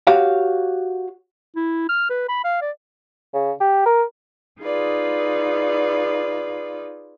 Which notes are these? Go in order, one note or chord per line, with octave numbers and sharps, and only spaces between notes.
F#4 G4 C#5 F5
E4
F6
B4
B5
F5
D5
C#3
G4
A#4
D#4 F4 G#4 B4 D5